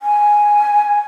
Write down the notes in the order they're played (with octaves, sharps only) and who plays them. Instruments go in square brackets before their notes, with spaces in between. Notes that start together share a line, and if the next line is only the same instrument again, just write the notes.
[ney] G#5